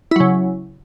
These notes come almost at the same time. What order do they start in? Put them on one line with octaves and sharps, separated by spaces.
E4 F#3 C#3